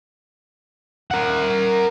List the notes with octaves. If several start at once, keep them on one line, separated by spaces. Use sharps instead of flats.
A#4 F#5